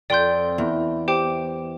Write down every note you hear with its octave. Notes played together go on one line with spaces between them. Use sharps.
F2 D5 G5 C6 G6
E2
G4 C5 G5 D6